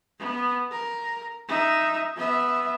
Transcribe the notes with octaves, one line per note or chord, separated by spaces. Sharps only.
B3
A#4
D#4 E5
B3 E5